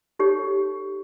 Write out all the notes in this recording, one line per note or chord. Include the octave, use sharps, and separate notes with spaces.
D#4 G4 A4 C#5